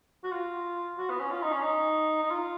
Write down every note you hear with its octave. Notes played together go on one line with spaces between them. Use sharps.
F#4
F4
F#4
B3
C#4
F4
D#4
C#4
D#4
D#4
F4